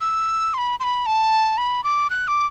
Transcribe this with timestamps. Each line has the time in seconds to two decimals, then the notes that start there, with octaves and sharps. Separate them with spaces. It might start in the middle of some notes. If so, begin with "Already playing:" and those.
0.01 E6
0.54 C6
0.58 B5
0.80 C6
0.84 B5
1.06 A5
1.58 B5
1.84 D6
2.10 F#6
2.28 D6